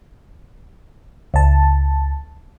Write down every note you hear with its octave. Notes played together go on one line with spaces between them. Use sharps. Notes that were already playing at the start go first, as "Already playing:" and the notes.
C#2 A5